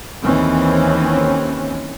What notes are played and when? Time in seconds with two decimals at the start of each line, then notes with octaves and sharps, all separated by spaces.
0.23 D#2 E3 C4 C#4